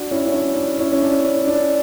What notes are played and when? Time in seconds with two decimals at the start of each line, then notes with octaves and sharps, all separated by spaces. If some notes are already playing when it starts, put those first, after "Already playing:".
Already playing: D4 F#4
0.11 C#4 E4
0.27 C#4
0.34 D4
0.57 D4
0.79 C#4 E4
0.92 C#4
1.02 D4
1.24 C#4
1.47 D4